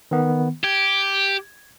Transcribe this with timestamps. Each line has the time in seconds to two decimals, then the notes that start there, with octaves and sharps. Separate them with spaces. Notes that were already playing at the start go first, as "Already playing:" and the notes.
0.11 D#3 B3
0.64 G4 G#6